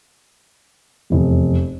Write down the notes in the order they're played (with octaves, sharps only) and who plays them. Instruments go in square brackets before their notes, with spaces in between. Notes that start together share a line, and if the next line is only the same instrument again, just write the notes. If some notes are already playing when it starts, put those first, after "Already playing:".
[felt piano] F1 E2